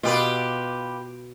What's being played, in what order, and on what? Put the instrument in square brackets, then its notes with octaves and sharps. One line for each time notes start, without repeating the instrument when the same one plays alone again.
[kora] B2 [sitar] F4 G4 B4